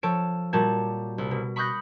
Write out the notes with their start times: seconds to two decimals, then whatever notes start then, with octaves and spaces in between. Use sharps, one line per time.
0.03 F3 A4 C#5 A5 D7
0.53 A#2 G3 F#4 A5 G#6
1.18 C2
1.31 B2
1.56 B5 C#6 D#6 F#6 G6 A#6